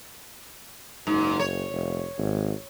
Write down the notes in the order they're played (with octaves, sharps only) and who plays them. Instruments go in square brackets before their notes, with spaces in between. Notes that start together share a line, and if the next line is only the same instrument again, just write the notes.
[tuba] F#1 [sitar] G#2
[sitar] C#5
[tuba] F1
G#1